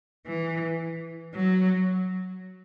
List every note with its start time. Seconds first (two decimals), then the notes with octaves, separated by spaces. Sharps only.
0.26 E3
1.34 F#3